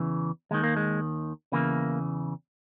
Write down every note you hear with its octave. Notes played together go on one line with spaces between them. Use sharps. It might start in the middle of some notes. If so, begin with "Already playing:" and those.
Already playing: E2 C#3 E3
D#2 D#3 G#3
A#3
G#3
E2 C#3 E3 A#3